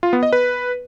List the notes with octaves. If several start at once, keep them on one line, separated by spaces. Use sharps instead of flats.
F4
B3
D#5
B4